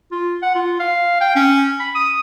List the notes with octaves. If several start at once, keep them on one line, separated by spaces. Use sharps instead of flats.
F4
F#5
F4
F5
G5
C#4
B5
D#6